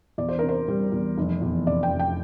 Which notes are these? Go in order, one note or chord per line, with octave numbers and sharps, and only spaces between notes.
E2 D5
C5
C3 A#4
C5
G3
E2
F1
E2
C3 D5
G5
F1
G5